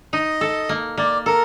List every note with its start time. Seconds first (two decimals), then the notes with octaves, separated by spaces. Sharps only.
0.13 D#4 D#5
0.41 A4
0.69 A#3
0.98 A#3 D5
1.26 A4 A#4